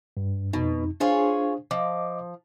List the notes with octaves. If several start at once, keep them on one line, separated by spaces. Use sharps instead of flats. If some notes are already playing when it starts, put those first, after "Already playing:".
G2
F2 B2 D#4
D4 F4 G#4 C5 C#5 F5
F3 D#5 D6